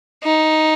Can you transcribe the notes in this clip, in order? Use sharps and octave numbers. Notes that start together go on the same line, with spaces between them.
D#4